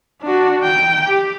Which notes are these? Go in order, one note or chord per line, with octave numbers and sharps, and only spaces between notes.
D4 F#4
G5
G4